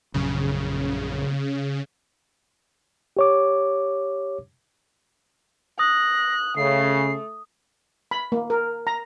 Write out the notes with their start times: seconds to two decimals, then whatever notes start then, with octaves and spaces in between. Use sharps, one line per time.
0.14 A#1 F#2 C#3
3.17 G4 C#5 D6
5.79 D#6 F#6 A#6
6.57 C#3 A3 C7
8.11 B5
8.32 A#3
8.50 A#4
8.87 A#5